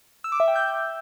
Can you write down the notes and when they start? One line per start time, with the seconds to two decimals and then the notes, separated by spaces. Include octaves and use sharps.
0.24 E6
0.32 D6
0.40 E5
0.48 G5
0.56 G6